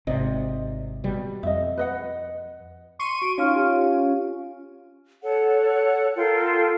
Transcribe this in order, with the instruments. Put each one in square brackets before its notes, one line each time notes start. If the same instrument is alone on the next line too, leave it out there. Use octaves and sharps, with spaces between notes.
[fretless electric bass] G#1 C3 [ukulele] D5 D#5
[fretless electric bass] B2 G3
[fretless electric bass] F2 [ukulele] D#5 E5
[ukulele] B4 D#5 F#5
[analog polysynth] C6 C#6 D#7
[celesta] F#4 D7
[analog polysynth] C#4 F4 [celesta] D#4 F5 F6
[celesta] G4 F5
[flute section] A4 C#5 F#5
F4 A4 A#4 G5